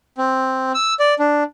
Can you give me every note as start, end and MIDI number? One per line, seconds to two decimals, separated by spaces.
0.18 0.72 60
0.74 0.94 88
0.99 1.14 74
1.19 1.44 62